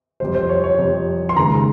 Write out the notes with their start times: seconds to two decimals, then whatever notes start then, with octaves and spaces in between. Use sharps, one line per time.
0.20 F2 C3 G3 C5
0.35 C5
0.49 C#5
0.64 C#5
0.78 F2 C3 G3
1.29 C6
1.36 D#2 C#3 G#3 A#5